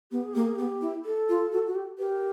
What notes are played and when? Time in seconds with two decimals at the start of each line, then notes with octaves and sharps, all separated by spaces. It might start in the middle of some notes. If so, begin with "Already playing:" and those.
0.11 B3 G4
0.23 G#4
0.34 A#3 G4
0.45 G#4
0.56 B3 G4
0.82 E4
1.05 A4
1.29 F4
1.52 F#4
1.67 F#4
1.75 G4
1.98 G4 A#4 B4